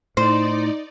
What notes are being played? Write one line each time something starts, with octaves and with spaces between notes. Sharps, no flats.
A2 D#4 C5 D5